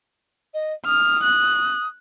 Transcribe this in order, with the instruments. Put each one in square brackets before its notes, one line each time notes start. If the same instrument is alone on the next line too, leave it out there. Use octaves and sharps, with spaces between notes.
[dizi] D#5
[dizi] D#6 [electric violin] F6
[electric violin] F#6